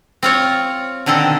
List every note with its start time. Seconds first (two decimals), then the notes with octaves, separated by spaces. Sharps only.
0.23 C4 F4 C#5
1.06 B2 D3 D#3 C4 A4